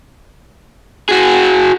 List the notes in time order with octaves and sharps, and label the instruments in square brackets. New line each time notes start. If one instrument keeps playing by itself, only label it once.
[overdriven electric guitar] F#4 G#4